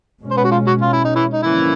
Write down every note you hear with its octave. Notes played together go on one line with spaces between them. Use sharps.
B2 G#3 C#4
C5
B3 B4
F#4
F3 F4
F#3 F#4
F4
E4
D#4
E3 E4
D#4
D3 E3 F3 A#3 C#4 E4